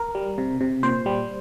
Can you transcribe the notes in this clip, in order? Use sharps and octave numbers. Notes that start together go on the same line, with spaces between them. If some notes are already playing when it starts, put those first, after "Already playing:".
Already playing: A#4
G3
C3
C3
A#2 C5
G3